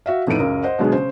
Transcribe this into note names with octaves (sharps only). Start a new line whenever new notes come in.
F#4 E5 F5
F2 A2 B3 D#4 D7 D#7
C#2 F#2 A#4
C5 D#5 F#5
B2 D3 F#3 G#3 B3 G#4
C#3 C5